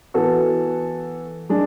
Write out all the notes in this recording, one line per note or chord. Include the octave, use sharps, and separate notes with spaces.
E3 B3 F#4 A4
G#3 D4